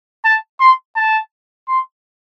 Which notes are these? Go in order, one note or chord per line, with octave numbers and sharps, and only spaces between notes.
A5
C6
A5
C6